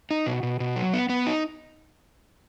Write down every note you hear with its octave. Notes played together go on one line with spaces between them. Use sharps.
D#4
B2
B2
B2
F#3
B3
B3
D#4